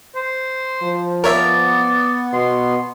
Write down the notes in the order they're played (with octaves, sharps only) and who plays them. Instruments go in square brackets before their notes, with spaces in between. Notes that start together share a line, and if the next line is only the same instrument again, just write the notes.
[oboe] C5
[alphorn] F3
[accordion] B3 [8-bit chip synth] A#4 C#5 E5 [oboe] D5
[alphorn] B2 [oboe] C6